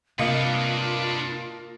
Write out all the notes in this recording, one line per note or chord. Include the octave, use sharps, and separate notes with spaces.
C3 A#3 D4 F4 B4 D#5 C#7